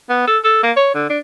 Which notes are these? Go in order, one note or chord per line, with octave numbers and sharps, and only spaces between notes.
B3
A4
A4
A#3
C#5
D3
D4